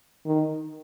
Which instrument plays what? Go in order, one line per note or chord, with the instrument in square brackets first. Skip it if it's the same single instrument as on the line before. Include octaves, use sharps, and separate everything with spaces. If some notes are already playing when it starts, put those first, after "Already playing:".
[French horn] D#3